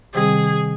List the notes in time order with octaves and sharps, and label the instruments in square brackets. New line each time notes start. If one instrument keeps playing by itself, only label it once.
[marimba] C3 D#3 G3 C4 [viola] G#4